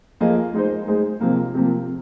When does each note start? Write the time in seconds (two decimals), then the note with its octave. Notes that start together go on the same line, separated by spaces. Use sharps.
0.20 F3 A#3 G#4 D#5
0.54 G#3 D#4 G#4 C5
0.88 G#3 D#4 G#4 C5
1.20 C3 F3 A#3
1.55 C3 F3 A#3